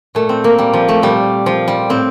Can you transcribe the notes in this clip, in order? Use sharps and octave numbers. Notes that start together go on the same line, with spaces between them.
A#2 A3
C4
A#3
G3
F3
A3
A#2 G3
F3
G3
A2 C4